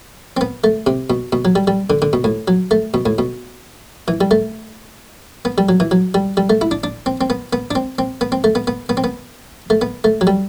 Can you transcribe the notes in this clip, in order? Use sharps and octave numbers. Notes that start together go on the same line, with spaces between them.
C4
B3
A3
C3
B2
B2
F#3
G3
G3
D3
D3
B2
A2
F#3
A3
B2
A2
B2
E3
G3
A3
B3
G3
F#3
E3
F#3
G3
G3
A3
E4
D4
D4
C4
C4
B3
B3
D4
C4
C4
B3
C4
A3
B3
B3
B3
C4
B3
A3
B3
A3
F#3
G3